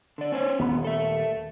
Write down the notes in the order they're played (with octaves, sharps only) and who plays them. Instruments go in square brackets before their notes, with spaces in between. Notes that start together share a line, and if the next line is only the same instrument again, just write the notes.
[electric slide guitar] D3 D5
C#4 C5 C#5
[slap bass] D#1 D#2 [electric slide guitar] B3
[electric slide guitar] A4 E5